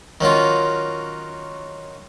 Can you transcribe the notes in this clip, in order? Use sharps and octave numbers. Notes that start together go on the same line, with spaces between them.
D#3 F#3 C#4 F4